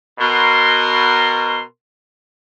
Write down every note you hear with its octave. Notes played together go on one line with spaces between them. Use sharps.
B2 A#4 C6